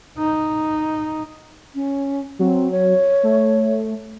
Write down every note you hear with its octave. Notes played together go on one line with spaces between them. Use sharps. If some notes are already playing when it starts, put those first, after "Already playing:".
D#4
C#4
F#3 C4
C#5
A3